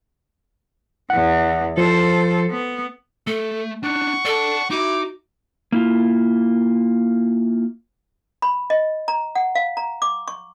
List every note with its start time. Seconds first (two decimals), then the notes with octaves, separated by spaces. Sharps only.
1.10 E2 E3 F#5
1.77 F3 A4 C5
2.50 B3
3.27 A3 A4
3.83 D4 D#4 F#5 C#6 F#6
4.25 A4 D5 A5
4.71 D#4 E4 F#4 D6
5.72 A#3 E4 F4
8.42 B5
8.70 D#5
9.08 A#5
9.35 F#5
9.55 F5
9.77 A#5
10.02 D6
10.28 C#6